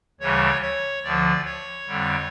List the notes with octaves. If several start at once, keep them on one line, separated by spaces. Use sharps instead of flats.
D2 C#3 E3 G3 C#5
C#5
D2 D3 F3 D5
C#5
F2 D3 G3